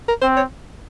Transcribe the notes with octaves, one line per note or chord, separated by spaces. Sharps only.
A#4
C4 C5
C#5